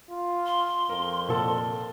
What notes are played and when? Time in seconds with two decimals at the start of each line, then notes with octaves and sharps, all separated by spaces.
0.10 F4
0.46 C6
0.89 F2 A#4
1.29 A#2 A4